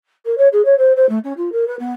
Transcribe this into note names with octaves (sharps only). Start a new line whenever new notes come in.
A#4
C#5
G#4
C#5
C5
C5
A3
C#4
F4
A#4
B4
B3